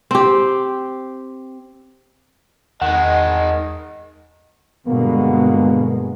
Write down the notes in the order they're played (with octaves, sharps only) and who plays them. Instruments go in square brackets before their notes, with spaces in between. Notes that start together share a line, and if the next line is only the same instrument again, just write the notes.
[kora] C4 G4
[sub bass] E2 [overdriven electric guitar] D#3 G#3 [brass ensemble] D#5 [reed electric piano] F#5
[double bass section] G2 B2 G#3 [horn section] D3 A#3 B3